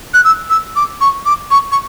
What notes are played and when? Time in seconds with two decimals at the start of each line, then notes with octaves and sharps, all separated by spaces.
0.14 F#6
0.24 E6
0.50 E6
0.76 D6
1.01 C#6
1.26 D6
1.51 C#6
1.72 C#6